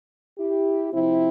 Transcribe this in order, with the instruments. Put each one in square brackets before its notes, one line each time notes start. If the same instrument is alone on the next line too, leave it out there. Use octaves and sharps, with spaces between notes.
[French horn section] E4 G4
C3 F3 C4 E4